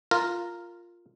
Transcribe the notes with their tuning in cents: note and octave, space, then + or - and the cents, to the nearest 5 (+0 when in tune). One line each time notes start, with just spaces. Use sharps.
F4 +0 A#4 -10